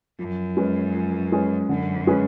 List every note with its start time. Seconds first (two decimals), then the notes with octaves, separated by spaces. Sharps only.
0.19 F#2 F3
0.57 G#3 C#4 G#4 B4
0.94 F3
1.32 G#3 C#4 G#4 B4
1.69 F#2 D3
2.07 G#3 C#4 G#4 B4